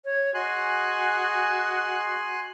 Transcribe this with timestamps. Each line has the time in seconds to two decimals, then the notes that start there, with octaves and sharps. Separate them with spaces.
0.05 C#5
0.34 F#4 G#4 D#5 G#5 C6 F#6